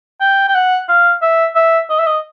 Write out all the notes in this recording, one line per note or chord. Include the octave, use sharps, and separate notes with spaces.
G5
G5
F#5
F5
E5
E5
D#5
E5
D#5